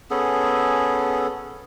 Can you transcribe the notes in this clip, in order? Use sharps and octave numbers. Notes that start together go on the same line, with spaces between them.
B3 C#4 G#4 A4